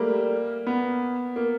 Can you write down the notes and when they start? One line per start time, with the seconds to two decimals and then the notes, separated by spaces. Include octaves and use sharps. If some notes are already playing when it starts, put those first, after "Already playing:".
Already playing: G3 A3 A#3
0.67 B3
1.36 A#3